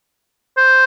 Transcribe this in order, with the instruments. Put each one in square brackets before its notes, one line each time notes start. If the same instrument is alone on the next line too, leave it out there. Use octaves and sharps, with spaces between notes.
[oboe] C5